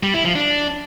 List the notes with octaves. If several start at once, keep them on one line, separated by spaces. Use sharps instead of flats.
G3
E4
F3
D4